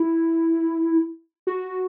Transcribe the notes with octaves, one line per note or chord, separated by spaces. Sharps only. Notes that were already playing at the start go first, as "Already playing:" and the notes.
Already playing: E4
F#4